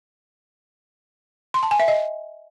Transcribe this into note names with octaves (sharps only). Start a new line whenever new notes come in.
C6
A5
G#5
E5
D#5